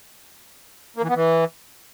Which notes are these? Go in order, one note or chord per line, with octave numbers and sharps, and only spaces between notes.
A#3
E3
B3
E3